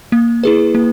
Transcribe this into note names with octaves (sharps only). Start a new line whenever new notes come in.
A#3
E4 G#4 B4
A#3